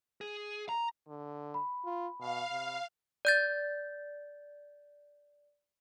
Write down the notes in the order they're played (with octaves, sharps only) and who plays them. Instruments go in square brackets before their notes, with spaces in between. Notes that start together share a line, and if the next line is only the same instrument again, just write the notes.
[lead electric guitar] G#4
A#5
[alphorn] D3
[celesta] B5
[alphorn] F4
[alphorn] B2 [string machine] F5
[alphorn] C3
[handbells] D5 G6 A6